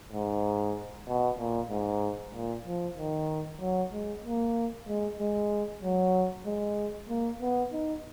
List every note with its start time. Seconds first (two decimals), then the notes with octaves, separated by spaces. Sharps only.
0.12 G#2
1.08 B2
1.39 A#2
1.70 G#2
2.34 A#2
2.66 F3
2.97 D#3
3.60 F#3
3.93 G#3
4.24 A#3
4.88 G#3
5.20 G#3
5.82 F#3
6.46 G#3
7.09 A#3
7.41 B3
7.73 D#4